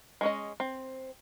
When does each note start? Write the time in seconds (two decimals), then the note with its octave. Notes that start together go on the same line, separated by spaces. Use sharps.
0.21 G#3 C#4 D#5
0.60 C4